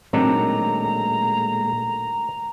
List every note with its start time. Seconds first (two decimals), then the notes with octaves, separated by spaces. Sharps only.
0.13 A#2 D#3 F#3 G#3 A3 C4 D4 A#5